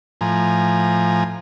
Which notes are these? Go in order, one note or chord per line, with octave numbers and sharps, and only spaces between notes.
A2 F3 G#5 A#5